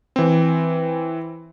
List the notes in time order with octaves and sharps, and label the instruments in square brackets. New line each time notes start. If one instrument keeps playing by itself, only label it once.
[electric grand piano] E3 C4